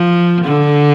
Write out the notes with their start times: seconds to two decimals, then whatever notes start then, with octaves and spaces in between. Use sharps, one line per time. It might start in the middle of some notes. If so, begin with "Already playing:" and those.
Already playing: F3
0.45 D3